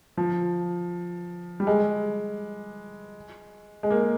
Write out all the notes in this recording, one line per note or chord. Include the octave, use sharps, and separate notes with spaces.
F3
G3
G#3
G#3
A#3